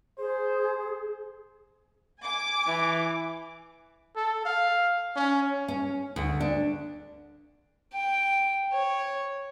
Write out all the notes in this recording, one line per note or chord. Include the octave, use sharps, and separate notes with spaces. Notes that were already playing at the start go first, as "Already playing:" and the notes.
G#4 C5
G#5 D6
E3
A4
F5
C#4
C#4
D2
D4
G5
C#5